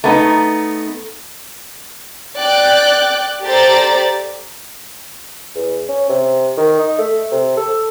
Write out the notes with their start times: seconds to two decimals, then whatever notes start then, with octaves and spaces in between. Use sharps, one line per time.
0.04 A3 B3 D#4
2.38 D5 G5 D6 F#6
3.44 G4 A4 C5 D5 A#5 A6
5.55 E2
5.89 C#4
6.09 C3
6.57 D#3
6.79 D#4
6.99 A3
7.31 C3
7.57 A4